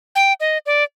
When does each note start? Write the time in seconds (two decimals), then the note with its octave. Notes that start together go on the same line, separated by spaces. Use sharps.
0.15 G5
0.40 D#5
0.66 D5